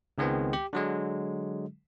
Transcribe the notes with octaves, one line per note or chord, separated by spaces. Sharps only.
C#2 D#3 G#3 B3 C4
G4
D3 F#3 G#3